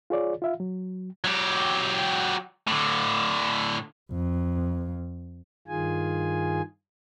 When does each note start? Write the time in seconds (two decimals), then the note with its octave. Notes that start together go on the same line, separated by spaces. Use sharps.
0.10 F4 G#4 C#5 D5
0.42 F4 E5 F5
0.60 F#3
1.25 F#3 G4
2.67 A2 D3
4.12 F2
5.68 G2 D#3 F4 G#4 G#5